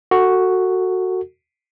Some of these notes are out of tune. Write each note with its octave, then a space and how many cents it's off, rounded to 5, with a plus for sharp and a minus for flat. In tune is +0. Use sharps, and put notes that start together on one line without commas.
F#4 +0 A4 +30